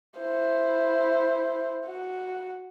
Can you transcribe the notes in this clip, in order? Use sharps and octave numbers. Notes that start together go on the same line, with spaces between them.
E4 C5
F#4